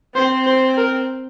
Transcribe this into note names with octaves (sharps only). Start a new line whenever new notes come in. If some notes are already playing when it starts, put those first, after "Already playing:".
C4 C5
C5
A#4